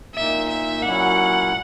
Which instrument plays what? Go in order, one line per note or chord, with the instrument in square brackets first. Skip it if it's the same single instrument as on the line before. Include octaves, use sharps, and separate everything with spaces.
[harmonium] A#2 A#3 D#4 [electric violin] E5
[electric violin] E5
[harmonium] A#2 F#3 C#4 E4 [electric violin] F#5